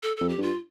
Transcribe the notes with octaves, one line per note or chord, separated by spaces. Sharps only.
A4
F2 A4
G4
G2 F4